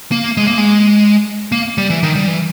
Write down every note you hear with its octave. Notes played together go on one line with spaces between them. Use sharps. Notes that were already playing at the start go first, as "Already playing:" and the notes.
A#3
G#3
A#3
G#3
A#3
G3
E3
D#3
G3
E3